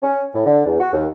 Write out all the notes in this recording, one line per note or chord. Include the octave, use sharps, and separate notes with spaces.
C#4
A2
D3
E2
F#4
D#2